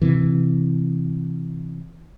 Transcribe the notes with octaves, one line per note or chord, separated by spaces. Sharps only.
C3 E3